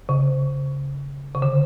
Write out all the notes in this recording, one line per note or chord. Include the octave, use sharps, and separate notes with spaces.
C#3
C#3
D3